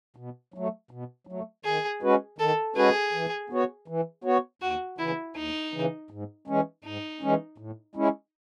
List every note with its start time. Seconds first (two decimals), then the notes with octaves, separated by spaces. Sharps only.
0.16 B2
0.54 F#3 A3
0.91 B2
1.27 F#3
1.32 A3
1.64 D#3 G#4
2.02 G#3 C#4 F#4 B4
2.39 D#3 A4
2.76 G#3 C#4 F#4 G#4 B4
3.13 E3
3.50 B3 F#4 C#5
3.88 E3
4.24 B3 F#4 C#5
4.61 D#2 F#4
4.98 C#3 E3 E4
5.36 D#2 D#4
5.74 C#3 E3
6.11 G#2
6.48 E3 G#3 C#4
6.84 G#2 D#4
7.21 E3 G#3 C#4
7.58 A2
7.95 G#3 C#4 E4